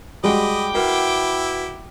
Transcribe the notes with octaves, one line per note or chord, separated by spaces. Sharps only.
G3 G#3 F#4 G#4 D#5 G5 B5 D6
E4 F#4 A#4 B4 F#5